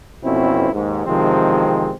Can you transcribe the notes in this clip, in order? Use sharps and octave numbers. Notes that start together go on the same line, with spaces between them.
A1 F2 B2 C4 C#4 E4
D#2 G#2
E2 C3 D#3 F3 G#3 C4